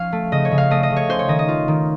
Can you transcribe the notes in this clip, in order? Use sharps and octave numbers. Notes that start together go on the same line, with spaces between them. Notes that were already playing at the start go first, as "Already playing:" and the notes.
Already playing: F3 C#4 F5
A3
C#3 D#5
C#5
C#3
F5
A3 D#5
D#5
C#3
C#5
C#4 C5
C#5
D#3 D#5
D#5
F4
D#3